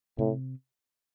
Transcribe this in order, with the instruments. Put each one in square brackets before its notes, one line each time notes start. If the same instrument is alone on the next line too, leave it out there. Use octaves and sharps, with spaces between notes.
[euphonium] A2 [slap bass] C3